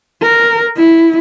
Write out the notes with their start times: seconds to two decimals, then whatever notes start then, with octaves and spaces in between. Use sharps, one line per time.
0.22 A#4
0.77 E4